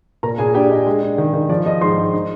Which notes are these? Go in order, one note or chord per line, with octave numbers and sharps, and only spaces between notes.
A#2 A#4 A#5
A#2 G#4 G#5
D4 G4 G5
D4 D#5
G#3
D4
D#3
D#3
F3 D5
F3 D#5
G#2 C5 C6
G#2
D#4